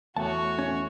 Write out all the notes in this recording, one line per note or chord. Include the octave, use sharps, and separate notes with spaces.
E2 A3 F#4 C#5 A5
C#4